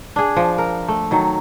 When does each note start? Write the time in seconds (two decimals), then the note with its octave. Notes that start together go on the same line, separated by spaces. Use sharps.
0.16 D4 G#4
0.36 F3
0.58 A#4
0.88 A3
1.11 D#3 F#3